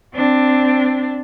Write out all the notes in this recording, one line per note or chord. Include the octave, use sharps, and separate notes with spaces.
C4 D4